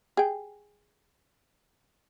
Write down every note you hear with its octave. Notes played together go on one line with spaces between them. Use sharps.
G#4 G5